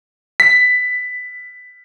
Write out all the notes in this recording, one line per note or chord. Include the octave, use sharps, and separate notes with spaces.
B6